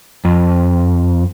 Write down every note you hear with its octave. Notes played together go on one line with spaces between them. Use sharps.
F2